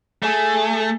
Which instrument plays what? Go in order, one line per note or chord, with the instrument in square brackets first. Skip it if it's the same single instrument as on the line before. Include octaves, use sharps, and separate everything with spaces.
[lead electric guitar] A3 [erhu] G#4